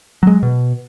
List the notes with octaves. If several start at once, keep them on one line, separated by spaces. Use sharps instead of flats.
F#3 G#3
B2